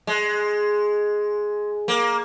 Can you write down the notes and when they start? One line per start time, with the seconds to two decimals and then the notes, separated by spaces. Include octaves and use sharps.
0.07 G#3
1.88 A#3